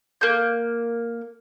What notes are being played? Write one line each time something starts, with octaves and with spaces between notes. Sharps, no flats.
A#3 G6